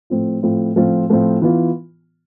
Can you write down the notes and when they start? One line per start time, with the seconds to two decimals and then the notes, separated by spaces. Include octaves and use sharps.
0.10 A2 F3 C4 F4
0.43 A2 F3 C4 F4
0.76 A2 F3 C4 F4
1.10 A2 F3 C4 F4
1.42 E3 B3 F4